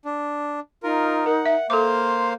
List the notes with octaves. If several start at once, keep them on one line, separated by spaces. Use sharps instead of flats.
D4
D#4 F4 A#4
A#4 F#5
E5
A#3 A4 C5 F5 C6 D6